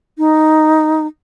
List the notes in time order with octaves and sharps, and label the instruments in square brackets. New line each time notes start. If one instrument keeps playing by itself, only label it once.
[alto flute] D#4